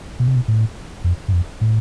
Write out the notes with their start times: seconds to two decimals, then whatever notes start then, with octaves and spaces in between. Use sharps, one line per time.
0.20 B2
0.28 C3
0.36 B2
0.48 A2
1.04 F2
1.28 G2
1.33 F2
1.61 A2